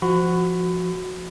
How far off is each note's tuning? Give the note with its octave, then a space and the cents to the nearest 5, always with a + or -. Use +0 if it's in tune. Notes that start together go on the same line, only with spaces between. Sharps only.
F3 -10 F#4 -5 B5 +25